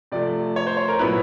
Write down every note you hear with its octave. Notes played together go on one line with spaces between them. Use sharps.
C3 F3 A3 D5
C#5
C5
C#5
A#4
A#2 F#3 B3 E4 B4